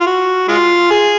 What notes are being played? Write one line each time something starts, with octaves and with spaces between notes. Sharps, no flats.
F4
F#4
G#3 F4
G#4